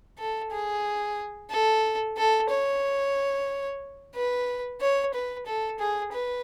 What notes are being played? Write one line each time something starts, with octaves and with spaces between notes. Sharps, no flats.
A4
G#4
A4
A4
C#5
B4
C#5
B4
A4
G#4
B4